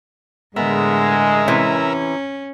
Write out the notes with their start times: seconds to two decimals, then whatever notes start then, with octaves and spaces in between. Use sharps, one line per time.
0.56 A2 D3 G#3 B3 A#4 E5
1.48 C3 E3 C#4